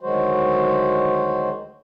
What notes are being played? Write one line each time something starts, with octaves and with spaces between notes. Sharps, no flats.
D2 D#3 F#3 G#3 F#4 C5